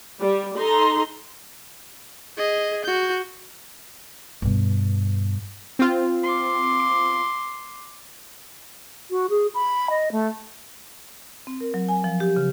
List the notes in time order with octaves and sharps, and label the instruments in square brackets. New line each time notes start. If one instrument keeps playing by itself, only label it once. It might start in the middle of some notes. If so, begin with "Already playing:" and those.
[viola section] G3
D#4 A4 A#5 C6
[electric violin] G#4 D#5
F#4 G6
[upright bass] G2 B2
[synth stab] C4 F4
[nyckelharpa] C6 D6
[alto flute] F#4
G#4
B5
D#5
A3
[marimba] C4
A#4
F#3
G#5
F3
G4
C#3